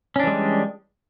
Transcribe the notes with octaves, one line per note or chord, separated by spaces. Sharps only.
E3 G3 G#3 C#4 D4